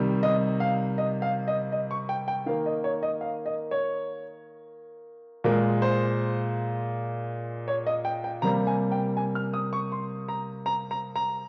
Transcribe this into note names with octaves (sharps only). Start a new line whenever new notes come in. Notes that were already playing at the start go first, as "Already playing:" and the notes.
Already playing: C3 D#3 G3
D#5
F5
D#5
F5
D#5
D#5
C#6
G5
G5
D#3 A#3 F5
D#5
C#5
D#5
F5
D#5
C#5
A#2 G#3 A#4
C5
C#5
D#5
G5
G5
C3 G3 A#3 A#5
G#5
G5
G#5
F6
D#6
C#6
C6
A#5
A#5
A#5
A#5